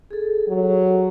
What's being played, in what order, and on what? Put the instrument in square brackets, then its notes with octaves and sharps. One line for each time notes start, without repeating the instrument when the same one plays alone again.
[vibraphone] G#4 A4
[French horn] F#3